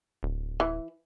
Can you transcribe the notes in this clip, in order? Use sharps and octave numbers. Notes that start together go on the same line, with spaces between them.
D1
E3